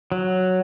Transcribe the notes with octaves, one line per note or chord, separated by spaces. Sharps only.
F#3